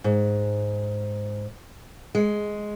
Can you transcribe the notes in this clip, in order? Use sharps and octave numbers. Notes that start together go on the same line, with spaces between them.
G#2
G#3